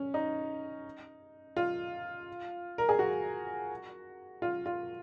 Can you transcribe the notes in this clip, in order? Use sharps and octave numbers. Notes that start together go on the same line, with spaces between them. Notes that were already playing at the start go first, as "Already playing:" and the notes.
Already playing: C#4
D#4
F4
A#4
G#4
F#4
F4
F4